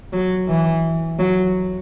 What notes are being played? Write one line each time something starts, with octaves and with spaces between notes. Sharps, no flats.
F#3
E3
F#3